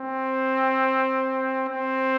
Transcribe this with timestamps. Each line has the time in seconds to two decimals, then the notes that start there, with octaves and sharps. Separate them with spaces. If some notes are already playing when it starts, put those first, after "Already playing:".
Already playing: C4
1.69 C4